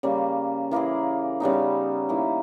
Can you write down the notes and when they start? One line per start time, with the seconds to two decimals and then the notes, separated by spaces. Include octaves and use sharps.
0.03 C#3 G3 A#3
0.71 E3 A#3 E4 G#4
1.40 C#3 G3 B3 D#4
2.09 D#3 A#3 E4